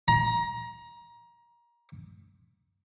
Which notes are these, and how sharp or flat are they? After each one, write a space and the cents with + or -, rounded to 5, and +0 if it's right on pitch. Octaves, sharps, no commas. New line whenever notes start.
A#5 +25